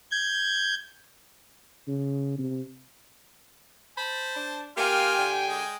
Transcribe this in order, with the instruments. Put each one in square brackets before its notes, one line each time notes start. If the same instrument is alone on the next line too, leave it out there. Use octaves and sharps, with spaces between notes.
[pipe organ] G6 G#6
[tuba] C#3
C3
[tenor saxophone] C5 [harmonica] A5 [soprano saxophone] B5
[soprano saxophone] D4
[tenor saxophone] A#3 [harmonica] F4 C6 F6 [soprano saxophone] G4 [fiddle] G5 G#5
[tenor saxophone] D3
[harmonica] G#3